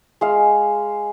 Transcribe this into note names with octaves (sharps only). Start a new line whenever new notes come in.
G#3 F5